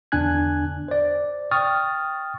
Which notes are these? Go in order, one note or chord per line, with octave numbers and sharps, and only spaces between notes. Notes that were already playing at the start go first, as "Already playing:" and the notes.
E2 D3 D4 G#5 F#6 G#6
C5 D5
G5 C#6 D#6 F6 A6